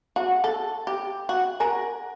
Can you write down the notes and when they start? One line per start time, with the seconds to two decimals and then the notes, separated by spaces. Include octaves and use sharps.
0.16 F#4
0.44 A4
0.87 G4
1.29 F#4
1.60 A#4 F#5 G#5